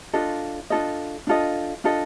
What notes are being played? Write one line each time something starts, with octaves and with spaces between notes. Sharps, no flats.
D4 F4 A4 D#5
D4 F4 A4 D#5
D4 F4 A4 D#5
D4 F4 A4 D#5